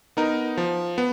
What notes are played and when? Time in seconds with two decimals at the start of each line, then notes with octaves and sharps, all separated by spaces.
0.17 B3 D#4 A#4
0.57 F3
0.98 B3